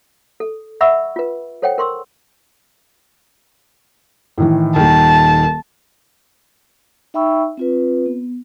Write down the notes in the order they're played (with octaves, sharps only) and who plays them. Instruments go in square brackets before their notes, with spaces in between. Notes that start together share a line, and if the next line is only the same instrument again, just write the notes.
[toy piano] A4
E5 F#5 B5 C#6 E6
F4 B4
A4 C5 C#5 F#5 G5
A#4 C6 C#6 E6
[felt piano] A2 D#3 E3
[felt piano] D#1 D#3 [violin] A5
[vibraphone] D#4 E5 G5 B5 C#6 E6
C4 F4 B4
B3